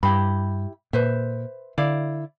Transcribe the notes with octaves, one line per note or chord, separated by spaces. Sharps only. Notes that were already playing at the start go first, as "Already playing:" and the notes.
G2 E4 G4 B5
A#2 B4 C5 E5
D3 E4 D5 F5